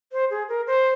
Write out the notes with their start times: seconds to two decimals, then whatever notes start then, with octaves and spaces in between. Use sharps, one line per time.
0.12 C5
0.31 G#4
0.49 A#4
0.67 C5